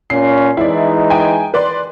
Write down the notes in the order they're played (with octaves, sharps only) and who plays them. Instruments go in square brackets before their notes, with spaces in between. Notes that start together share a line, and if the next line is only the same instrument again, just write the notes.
[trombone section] A#2 C#4 [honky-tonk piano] C7
[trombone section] E3 G#3 D#4 [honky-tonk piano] E4 D5
[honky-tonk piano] G5 G#5
B4 D5 C6